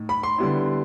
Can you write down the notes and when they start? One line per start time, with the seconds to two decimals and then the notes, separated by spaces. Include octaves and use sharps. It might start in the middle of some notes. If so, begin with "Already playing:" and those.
Already playing: A2 D#4
0.09 B5
0.23 C6
0.38 D3 G3 B3 E4